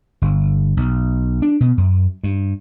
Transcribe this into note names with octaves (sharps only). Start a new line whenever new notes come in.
G1
B1
D4
B2
F#2
G2